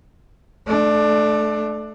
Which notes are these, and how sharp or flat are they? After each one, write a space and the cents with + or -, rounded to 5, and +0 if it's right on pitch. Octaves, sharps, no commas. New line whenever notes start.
A3 -15 D4 +15